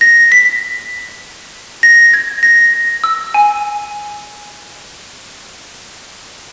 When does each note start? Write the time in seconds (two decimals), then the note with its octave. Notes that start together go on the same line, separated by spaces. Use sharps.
0.01 A#6
0.32 B6
1.83 A#6
2.13 G#6
2.43 A#6
2.74 A#6
3.04 E6
3.34 G#5